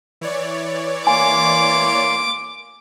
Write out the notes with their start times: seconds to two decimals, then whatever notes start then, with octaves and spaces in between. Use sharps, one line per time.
0.21 E3 C#5 D5
1.07 A#3 G#5 C6 D6